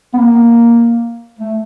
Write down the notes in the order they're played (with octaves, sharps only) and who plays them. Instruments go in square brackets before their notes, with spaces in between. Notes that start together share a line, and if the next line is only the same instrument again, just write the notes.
[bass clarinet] B3
A#3
A3